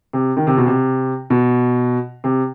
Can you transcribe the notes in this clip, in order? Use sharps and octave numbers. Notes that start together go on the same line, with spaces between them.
C3
D#3
C3
B2
C3
B2
C3